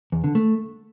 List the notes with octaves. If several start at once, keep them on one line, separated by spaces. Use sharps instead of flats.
E2
D3
A3